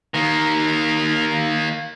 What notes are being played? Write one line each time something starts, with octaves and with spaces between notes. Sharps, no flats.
D#3 A#3